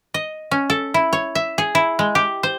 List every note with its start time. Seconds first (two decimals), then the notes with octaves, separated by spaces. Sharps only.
0.14 D#5
0.51 C#4
0.70 A4
0.94 E4
1.13 C#5
1.35 E5
1.58 G#4
1.75 E4
1.99 G#3
2.15 G4
2.43 C5